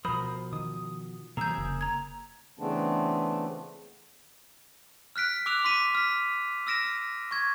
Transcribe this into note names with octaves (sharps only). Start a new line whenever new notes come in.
B2 F3 A#4 C5 B5 D#6
D#3 D#6
C3 E3 F#3 A#3 G#4 A#5 E6 G6
F1 C#3
A#5 G#6
C#3 E3 A3 B3 C4 D4
F6 F#6 B6 D7
D6 E6 F#6 D7 F7
C6 D6 B6 D#7
F6 B6
E6 F6 A#6 D7 E7
C#6 G#6